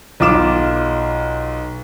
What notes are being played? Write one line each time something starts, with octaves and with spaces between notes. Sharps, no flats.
B1 F4 D6 E7